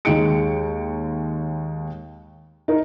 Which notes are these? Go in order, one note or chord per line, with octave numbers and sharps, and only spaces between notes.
D#2 G#3 D#4 G5 C#7 D7
D#4 A#4